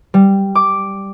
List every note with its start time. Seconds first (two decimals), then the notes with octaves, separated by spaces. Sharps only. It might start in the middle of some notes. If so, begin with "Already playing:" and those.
0.14 G3
0.55 D6